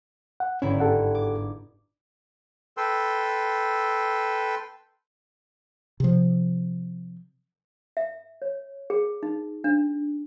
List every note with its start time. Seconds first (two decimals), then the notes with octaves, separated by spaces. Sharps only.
0.40 F#5
0.62 G1 G#2 C#4 E4
0.80 G4 A4 F#5
1.15 D6
2.77 A4 B4 G5 C6 E6
6.00 C3 F3
7.97 E5
8.42 C#5
8.90 G#4
9.23 D#4
9.64 D4